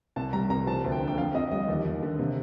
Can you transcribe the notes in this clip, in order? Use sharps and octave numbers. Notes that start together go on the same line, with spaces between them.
C2 A5
G3 A#5
C2 A#5
F3 A5
D2
G5
D3
G5
F2 F5
F2 D#5
G3 D#5
D#2
D#2
D3
C3